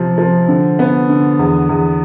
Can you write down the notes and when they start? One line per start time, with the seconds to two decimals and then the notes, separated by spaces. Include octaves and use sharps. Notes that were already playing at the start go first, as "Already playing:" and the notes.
Already playing: C3 F3
0.18 F3
0.48 D3
0.79 B3
1.09 D3
1.39 E2
1.69 E2